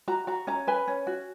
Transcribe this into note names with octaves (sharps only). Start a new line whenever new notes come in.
F#4 A#5
F#4 A#5
C#4 A#5
B4 G#5
C#4
F#4